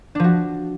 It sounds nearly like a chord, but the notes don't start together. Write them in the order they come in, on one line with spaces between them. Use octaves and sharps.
D4 F3 F#4